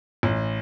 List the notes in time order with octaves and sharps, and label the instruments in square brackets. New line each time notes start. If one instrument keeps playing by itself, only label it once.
[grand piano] A1